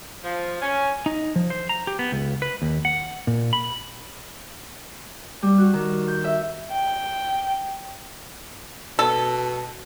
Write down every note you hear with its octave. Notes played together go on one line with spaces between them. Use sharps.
F3
C#4
D#4
F3
C5
A#5
G4
B3
C#2
B4
D#2
F#5
A#2
B5
G3
F#4
D#3
G6
E5
G5
B2 A4